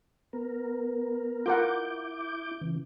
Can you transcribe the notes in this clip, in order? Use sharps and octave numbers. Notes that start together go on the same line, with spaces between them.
B3 A#4
E4 F4 A#4 F#5 D6 G6
C#3 E3